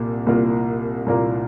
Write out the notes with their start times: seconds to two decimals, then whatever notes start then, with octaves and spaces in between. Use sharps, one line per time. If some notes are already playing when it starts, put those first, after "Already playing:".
Already playing: C2 A#2 A#3 F4
0.26 C2 A#2 A#3 F4 A#4
1.06 C2 A#2 A#3 F4 A#4